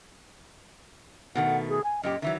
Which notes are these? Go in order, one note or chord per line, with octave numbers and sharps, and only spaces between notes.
B2 D#3 A3 F#5
G#4
G#5
F#2 A#2 G4 D#5
D#3 E3 F#3 E5